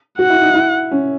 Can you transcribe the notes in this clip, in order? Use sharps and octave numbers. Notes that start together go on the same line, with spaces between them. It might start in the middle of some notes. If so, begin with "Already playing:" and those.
F#4 F#5
E4
D#4
E4
C#4